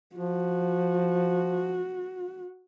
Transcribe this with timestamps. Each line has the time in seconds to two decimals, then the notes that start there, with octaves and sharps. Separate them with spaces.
0.16 F3 F#4